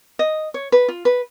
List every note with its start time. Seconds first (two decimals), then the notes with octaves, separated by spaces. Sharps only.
0.19 D#5
0.54 C#5
0.72 B4
0.88 F4
1.05 B4